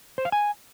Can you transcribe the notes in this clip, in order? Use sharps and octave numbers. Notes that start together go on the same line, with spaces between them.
C5
F5
G#5